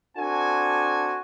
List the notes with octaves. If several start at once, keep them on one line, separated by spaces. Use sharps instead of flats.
C4 D4 F#4 A4 G#5